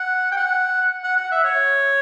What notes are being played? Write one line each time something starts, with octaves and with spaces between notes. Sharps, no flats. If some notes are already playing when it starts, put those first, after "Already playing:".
Already playing: F#5
G5
F#5
F#5
F#5
E5
C#5